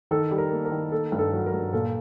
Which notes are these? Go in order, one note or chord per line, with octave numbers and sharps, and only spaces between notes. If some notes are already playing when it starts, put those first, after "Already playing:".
D#3 A4
G3
A#4
A#3
A#4
D#3
A#3 A4
G2
A4
F#3
A#4
G2
A#2 A4